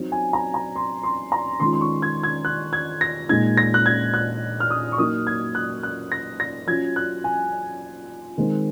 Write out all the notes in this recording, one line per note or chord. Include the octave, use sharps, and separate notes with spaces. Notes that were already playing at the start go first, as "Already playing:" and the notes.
Already playing: F#3 C4 D#4
G#5
A#5
A#5
C6
C6
A#5
D#3 G#3 C#4 F4 C6
C6
C#6
G#6
G#6
F#6
G#6
A#6
A#2 G#3 D#4 G#6
A#6
F#6
G#6
F#6
F6
D#6
C#6
F#3 A#3 D#4 D#6
G#6
F#6
F#6
A#6
A#6
F#3 C#4 F4 G#6
F#6
G#5
D#3 G#3 C4